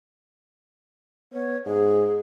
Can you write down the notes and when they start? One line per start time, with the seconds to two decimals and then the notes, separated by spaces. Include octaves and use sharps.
1.33 B3 C#5
1.66 G#2 G#4